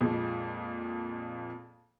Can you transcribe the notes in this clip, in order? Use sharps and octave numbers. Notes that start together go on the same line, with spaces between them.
F2 A#2 F3 G#3